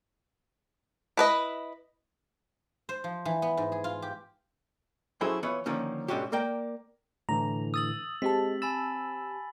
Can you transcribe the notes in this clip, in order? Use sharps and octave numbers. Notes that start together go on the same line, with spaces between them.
E4 B4 D#5
C5
F3
E3
B3
G#2
G#4
F4
G4
F#3 C#4 E4 G#4 A4 C5
E3 B3 F4 C#5
D3 D#3 F3 A#3 C#4
G#2 B2 D3 C#4 F#4 G4
A#3 A#4 D5 G5
A2 D3 E3 A#5 F7
D#6 E6 A6 F#7
G#3 C4 G4 A5 B6
G#5 B5 E6 A6